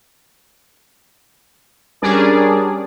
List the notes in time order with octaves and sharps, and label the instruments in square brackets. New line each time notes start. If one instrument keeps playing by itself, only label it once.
[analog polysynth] G3 C#4 D4 G#4 A#4 D5